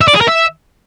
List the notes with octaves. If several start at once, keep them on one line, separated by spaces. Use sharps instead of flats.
E5
D5
G#4
A#4
E5